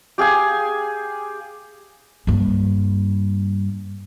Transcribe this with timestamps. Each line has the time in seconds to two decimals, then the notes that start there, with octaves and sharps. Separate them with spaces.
0.18 G4 G#4 F5 G#5
2.27 G2 A#3